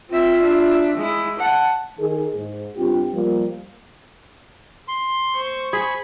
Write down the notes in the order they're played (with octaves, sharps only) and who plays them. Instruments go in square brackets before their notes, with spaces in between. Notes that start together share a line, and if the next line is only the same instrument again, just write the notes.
[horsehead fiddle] C4 E5 [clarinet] F4
[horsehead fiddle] D4 E5
G#3 E4
[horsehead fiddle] F#5 [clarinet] A5
[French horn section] D#3 G#4
G#2
G2 C4 F4 G4
F3 G3 A#3
[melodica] C6
[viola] C5 C#6
[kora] G#4 [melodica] B5